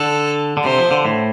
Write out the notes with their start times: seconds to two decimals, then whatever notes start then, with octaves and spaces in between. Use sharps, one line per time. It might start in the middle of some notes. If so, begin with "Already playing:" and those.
Already playing: D3 A4
0.57 D3
0.65 C3 C5
0.78 F3
0.91 D3
1.05 A2